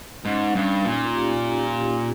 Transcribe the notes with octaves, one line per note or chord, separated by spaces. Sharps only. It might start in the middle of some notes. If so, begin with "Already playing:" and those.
G#2 C#4
C#4
G2
D#4
A#2
F4
G4
F4
G4
F4